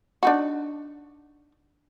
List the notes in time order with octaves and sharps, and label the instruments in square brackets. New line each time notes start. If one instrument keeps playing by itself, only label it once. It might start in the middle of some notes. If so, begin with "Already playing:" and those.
[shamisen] D4 D#4 F#4